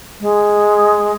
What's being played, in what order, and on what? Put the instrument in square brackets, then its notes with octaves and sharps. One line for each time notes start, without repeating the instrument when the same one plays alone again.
[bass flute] G#3